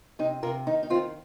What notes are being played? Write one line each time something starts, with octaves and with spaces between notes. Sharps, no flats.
C3 D#4
C3 F4 A#4
D#3 D#4
D#4
D#3 C4 F4